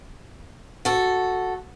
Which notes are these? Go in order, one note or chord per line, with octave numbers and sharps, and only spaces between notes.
F#4 A4